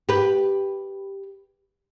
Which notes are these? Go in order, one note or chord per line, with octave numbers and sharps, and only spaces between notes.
G4 B4